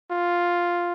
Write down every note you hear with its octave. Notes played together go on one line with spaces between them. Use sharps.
F4